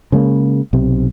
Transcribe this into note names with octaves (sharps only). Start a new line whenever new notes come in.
C#3 G#3 A#3
B1 C3